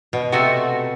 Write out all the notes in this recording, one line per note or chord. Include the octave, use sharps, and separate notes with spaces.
B2
C3 A3 F#4